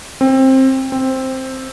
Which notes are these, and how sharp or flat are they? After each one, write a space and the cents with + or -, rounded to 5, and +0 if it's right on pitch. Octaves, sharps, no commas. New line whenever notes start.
C4 +20
C4 +5